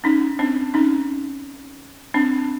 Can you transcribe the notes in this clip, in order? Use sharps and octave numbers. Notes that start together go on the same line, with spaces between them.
C#4 D#4
C4 D4
C#4 D#4
C4 D4